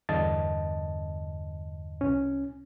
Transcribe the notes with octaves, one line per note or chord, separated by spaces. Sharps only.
E2 G2 D3 D#5 A5 A6
C2 C#4